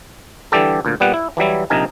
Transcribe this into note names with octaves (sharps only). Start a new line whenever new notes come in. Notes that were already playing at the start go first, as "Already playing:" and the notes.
D3 E3 G3 G4 A4
D2 A#2
A#2 G3 B3 F#5
E4
E3 F#3 G3 E4
A#1 C3 D#4 A#4 G#5